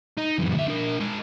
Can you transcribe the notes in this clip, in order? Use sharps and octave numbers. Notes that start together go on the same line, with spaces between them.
D#4
F#2 E3
D2 E5
D4 A#4
G#3 A#4